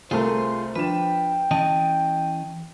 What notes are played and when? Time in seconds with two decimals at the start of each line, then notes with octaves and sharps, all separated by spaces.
0.11 C2 A3 F4 G#4 A#4 C5
0.76 F3 D4 B4 G5 E7
1.51 E3 C#4 D#5 A5